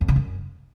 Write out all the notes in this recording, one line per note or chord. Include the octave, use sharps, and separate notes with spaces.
F2
C#3
F#2